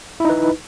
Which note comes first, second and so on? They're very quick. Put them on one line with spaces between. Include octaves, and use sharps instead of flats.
E4 D#4 B4